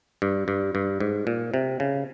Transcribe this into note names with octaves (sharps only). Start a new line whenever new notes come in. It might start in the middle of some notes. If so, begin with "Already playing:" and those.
G2
G2
G2
G#2
A#2
C3
C#3